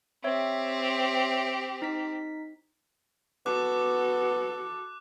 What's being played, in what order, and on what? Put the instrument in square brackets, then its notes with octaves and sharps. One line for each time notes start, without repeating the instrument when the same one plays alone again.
[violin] C4 G4 [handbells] C#5 E5
[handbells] D#4 B6
[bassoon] B3 [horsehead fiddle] F#4 A4 [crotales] D6 F#6